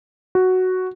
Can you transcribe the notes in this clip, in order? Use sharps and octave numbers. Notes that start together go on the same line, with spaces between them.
F#4